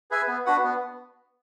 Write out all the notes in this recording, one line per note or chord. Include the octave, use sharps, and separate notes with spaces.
G#4 B4 E5 G#5
B3
D4 F#4 B4 F#5
B3